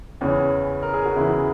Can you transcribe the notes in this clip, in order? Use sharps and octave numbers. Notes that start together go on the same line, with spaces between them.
E2 C#3 E3 C#4
A#4
G#4
F#4
E2 C#3 E3 E4